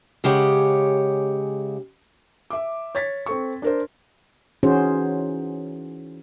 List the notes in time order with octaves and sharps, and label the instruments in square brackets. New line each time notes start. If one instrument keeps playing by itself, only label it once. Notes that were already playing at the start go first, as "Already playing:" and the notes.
[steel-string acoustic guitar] C#3 G#3 G4 C#5 F#5
[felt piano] E5 D6
C#5 G#6 A6 B6
C4 A4 C#6
D4 A#4 C5
[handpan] E3 C#4 D#4 F#4 G#4 C5